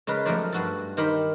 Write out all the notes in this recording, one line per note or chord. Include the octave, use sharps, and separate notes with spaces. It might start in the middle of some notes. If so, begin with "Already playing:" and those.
C#3 G#3 A#4 B4
F#2 F3 A3 A#4 C5 D5
G2 F#4 A4
D#3 G4 A#4 C5 B5